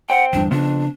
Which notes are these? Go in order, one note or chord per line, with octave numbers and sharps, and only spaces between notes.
C5 F#5 G5
G1 E2 G2 D4
F2 C#3 B3 D4